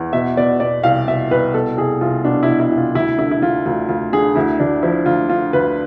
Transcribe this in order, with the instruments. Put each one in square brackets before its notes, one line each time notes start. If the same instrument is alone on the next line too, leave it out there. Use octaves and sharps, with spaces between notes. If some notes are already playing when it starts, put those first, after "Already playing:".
Already playing: [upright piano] E2
B2 E5
B2 D5
B2 D5
C2 F5
B2 E5
C2 B4
B2 A4
C2 G#4
C2 F4
B2 D4
B2 E4
E4
C2
F4
D2 E4
D3 E4
E4
D3 F4
D2 F4
D2 F4
D3 G#4
D2 E4
D2 D4
F3 E4
D2 F4
D3 F4
D2 B4